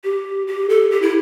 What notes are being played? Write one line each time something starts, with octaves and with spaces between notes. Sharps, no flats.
G4
G4
A4
G4
E4